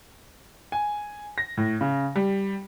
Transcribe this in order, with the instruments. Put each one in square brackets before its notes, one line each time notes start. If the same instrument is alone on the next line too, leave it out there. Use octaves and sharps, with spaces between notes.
[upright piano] G#5
A#6
A2
C#3
G3